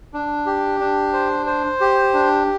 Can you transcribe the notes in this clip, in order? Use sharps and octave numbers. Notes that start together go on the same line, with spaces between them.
D4
G4
D4
C5
C5
G4
D4